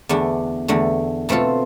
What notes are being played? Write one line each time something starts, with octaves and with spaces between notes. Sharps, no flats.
E2 D3 A3 D4
E2 D3 A3
B2 A3 C4 F4 A4